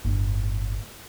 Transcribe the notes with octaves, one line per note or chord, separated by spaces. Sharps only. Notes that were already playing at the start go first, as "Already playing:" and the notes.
G1 A2